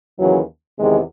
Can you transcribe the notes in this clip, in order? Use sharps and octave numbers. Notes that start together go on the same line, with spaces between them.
D#2 C#3 E3 F#3
E2 C3 D#3 G#3